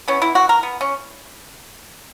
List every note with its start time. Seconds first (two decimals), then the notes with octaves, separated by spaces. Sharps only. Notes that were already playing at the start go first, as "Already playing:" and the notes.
0.08 E3 B3 C#4
0.22 E4
0.35 F#4
0.49 A#4
0.63 B3
0.81 C#4